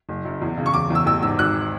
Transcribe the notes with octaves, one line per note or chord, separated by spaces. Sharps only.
F#1
F#2
E2
C#3
C#6
E1 D6
E2 E6
A1 E6
G#2 E6
G#1 F#6